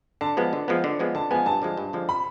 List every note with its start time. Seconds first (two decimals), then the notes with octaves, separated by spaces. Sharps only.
0.21 D3 A5
0.37 F3 G#3 B3
0.53 D3
0.68 F3 G#3 B3
0.84 D3
0.99 F3 G#3 B3
1.15 D3 A5
1.31 F3 G#3 B3 G#5
1.46 G2 A5
1.62 D3 F3 G#3
1.77 G2
1.93 D3 F3 G#3
2.09 B5